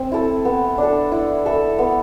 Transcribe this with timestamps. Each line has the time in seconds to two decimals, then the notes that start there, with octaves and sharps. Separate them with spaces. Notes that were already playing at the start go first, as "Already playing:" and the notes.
Already playing: C4
0.12 E4 A4
0.45 B3
0.78 D4 A4
1.12 E4
1.46 A4 E5
1.79 B3